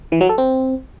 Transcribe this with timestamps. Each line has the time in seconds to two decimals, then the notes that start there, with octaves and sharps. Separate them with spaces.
0.12 E3
0.21 F#3
0.29 A4
0.38 C4